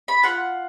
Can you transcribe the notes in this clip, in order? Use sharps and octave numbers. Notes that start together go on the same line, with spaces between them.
B5
F4 F#5